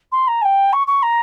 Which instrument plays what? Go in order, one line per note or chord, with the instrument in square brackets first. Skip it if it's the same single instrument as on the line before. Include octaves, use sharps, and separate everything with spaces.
[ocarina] C6
A#5
G#5
G5
C#6
C#6
A#5